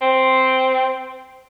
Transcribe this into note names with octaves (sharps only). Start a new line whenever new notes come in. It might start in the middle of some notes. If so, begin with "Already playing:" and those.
C4